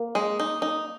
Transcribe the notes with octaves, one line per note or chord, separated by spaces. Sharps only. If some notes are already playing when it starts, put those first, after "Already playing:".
Already playing: A#3
G#3
D#4
D#4